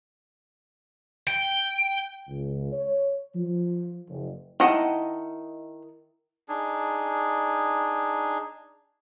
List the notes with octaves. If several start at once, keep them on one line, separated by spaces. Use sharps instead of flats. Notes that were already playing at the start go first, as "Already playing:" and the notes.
G5
C#2
C#5
F3
F#1
D#3 E4 D#5 F#5 A5
D4 D#4 G#4